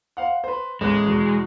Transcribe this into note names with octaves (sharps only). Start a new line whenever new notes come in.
C5 F5 F#5
B4 C5
A1 G#3 B3 F#6
E2 B2